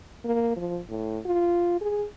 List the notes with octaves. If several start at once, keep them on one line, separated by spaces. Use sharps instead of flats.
A#3
F3
A2
F4
G#4